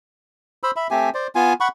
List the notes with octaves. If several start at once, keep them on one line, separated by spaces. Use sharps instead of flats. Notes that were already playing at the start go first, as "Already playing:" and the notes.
C5 B5 E6
E5 B5
A3 C4 G4 G#5
C5 D5
B3 F4 G#5
F#5 B5 C#6